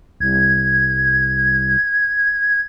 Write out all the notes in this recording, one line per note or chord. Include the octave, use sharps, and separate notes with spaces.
C2 G#6